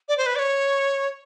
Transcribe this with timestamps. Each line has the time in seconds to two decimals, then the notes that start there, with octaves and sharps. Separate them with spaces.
0.09 D5
0.18 C5
0.26 B4
0.36 D5
0.39 C#5